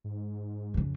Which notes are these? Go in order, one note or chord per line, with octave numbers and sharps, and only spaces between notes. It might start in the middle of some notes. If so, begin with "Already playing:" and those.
G#2
F2 C#3